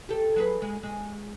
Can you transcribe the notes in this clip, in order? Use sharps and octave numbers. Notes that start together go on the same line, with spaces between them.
G4 A4
F#3 G#4 B4
G#3
G#3